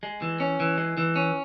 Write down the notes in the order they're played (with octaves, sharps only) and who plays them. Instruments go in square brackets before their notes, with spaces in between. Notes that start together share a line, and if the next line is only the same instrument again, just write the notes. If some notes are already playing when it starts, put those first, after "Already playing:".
[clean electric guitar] G#3
E3
C#4
E3
G#3
E3
C#4